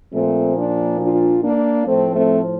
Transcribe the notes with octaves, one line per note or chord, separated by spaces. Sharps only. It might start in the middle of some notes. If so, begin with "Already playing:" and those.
A#2 F3 A3 C4
A#3 D4
D4 F4
A#3 D4
A2 F3 A3 C4
A3 C4